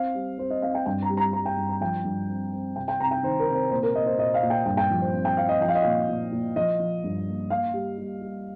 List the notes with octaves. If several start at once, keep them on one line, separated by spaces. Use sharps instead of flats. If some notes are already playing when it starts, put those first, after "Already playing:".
Already playing: C4 F5
G3
C4 C5
D#5
C4 F5
G5
G2 G5
A#5
G3
A#5
G3 A#5
G5
G2
A#5
F3 G5
G2
C4
C4
C3 G5
G5
C3 A#5
G5
D#3 C5
A#4
C3
C5
A#2 C5
A#4
A#3 D#5
C5
A#2 D#5
F5
A#2
G5
G2 G5
G5
F3
C5
C4
G5
C4 F5
D#5
F3 G5
F5
D#5
A#2 F5
A#2
A#2
F3 D#5
F3
G2
A#3
A#3 F5
G3
G3
G3